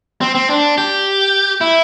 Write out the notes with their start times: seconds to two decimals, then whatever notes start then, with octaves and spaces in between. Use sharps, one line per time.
0.21 C4
0.35 C4
0.49 D4
0.78 G4
1.61 E4